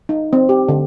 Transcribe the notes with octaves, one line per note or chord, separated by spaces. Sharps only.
D#4
C4
G4
D3